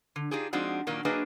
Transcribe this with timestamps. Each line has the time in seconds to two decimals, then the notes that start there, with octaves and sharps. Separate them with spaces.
0.16 D3
0.31 D4 D#4 F4 G4 G#4
0.53 F3 G#3 C4 D4 D#4 F#4
0.87 A#2 D#3 F#3 A#3 D4
1.05 F#3 A#3 D4 G#4 B4 D#5